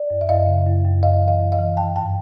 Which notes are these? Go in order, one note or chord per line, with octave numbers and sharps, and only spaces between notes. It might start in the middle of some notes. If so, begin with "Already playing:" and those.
Already playing: D5
F#2
E5
F#2 D#5 F5
C#3
F#2
F#2
F#2 D#5 F5
E3
D#5 F5
F#2
D#5 F5
E3
D#3 G5 A5
G2 G5 A5